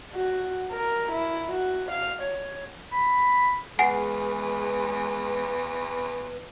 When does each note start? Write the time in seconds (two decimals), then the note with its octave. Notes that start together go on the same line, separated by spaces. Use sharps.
0.13 F#4
0.71 A#4
1.12 E4
1.52 F#4
1.91 F5
2.22 C#5
2.92 B5
3.79 E2 G#3 G#4 B4 F#5 G#5 C7